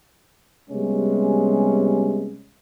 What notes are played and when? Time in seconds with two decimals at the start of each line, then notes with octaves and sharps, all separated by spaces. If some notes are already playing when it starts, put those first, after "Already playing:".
0.70 C3 G3 G#3 B3 C#4